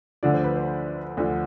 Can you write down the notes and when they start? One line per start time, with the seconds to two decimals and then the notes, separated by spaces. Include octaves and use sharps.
0.23 D2 D3 F3 D5
0.34 C5
0.44 B4
0.56 C5
1.17 D2 D3 F3